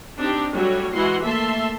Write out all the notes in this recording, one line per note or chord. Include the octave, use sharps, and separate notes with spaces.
C4 D4 D#4 G4
F#3 G3 A3 F#4 C#5
E3 G#3 E4 F#4 F#5 C6
A3 A#3 E5 A5 C6